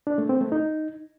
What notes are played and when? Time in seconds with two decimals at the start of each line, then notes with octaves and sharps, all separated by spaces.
0.07 D4
0.18 A3
0.29 C4
0.41 A3
0.52 D#4